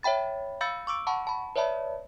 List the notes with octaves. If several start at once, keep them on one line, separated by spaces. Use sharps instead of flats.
C#5 E5 G5 B5 A6
F5 B5 E6 G6 A6 C#7
C#6 D6 E6 D7
F#5 A5 B5 C#6
A5 B5
B4 C#5 D5 E5 A5 B5